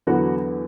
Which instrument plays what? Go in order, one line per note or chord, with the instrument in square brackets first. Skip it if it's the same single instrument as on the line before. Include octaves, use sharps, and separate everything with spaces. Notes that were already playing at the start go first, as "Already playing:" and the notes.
[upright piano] E2 D3 F#3 B3 F#4